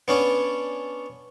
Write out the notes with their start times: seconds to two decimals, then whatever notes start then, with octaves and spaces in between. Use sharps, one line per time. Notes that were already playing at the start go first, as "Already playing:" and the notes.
0.08 B3 C#4 D4